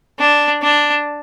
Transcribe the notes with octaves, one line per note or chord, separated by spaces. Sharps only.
D4
D4